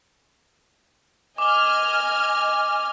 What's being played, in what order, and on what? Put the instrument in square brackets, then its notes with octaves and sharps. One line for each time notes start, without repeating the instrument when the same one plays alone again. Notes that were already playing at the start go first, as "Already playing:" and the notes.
[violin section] D#5 G#5 F6 [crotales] D6 G7